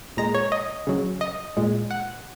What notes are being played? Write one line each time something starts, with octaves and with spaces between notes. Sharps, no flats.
A#2 G#3 A#5
C#5
D#5
C#3 F#3
D#5
A#2 G#3
F#5